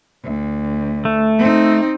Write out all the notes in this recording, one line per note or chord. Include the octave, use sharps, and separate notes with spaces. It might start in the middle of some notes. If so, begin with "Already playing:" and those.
D2
A3
C4 D#4